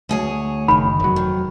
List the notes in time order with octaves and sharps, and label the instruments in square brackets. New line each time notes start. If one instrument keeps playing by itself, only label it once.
[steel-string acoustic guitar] D2 G#4 C#5
[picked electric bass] F#1 D#3 [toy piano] B5
[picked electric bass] F1 F#3
[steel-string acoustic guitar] D#3